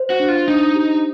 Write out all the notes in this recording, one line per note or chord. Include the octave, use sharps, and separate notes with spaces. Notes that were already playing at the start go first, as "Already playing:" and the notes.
Already playing: C5
F#4
D4
F4
D4 D#4
G4